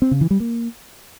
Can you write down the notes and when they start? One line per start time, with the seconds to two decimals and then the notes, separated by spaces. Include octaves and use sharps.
0.02 C4
0.11 C#3
0.21 E3
0.31 G3
0.40 A#3